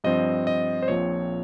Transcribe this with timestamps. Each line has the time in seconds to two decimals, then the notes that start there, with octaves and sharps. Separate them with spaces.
0.04 G2 F3 C4 D#5
0.47 D#5
0.83 C5
0.88 A#1 A#2 F3 C4 C#5